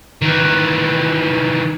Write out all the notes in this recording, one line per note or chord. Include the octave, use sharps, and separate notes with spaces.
D#3 E3